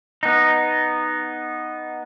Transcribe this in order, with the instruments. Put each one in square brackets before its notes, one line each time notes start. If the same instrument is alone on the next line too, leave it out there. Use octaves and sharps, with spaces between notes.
[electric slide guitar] B3 D#4